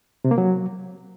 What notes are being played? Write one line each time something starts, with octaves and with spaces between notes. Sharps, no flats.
C3
A#3
F#3